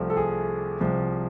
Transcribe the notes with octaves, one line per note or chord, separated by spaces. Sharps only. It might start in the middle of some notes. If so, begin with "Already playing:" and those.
Already playing: C2 C3 F3 A3
A4
G#4
C2 C3 F3